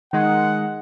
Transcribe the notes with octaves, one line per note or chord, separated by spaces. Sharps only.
D#3 G#3 F#5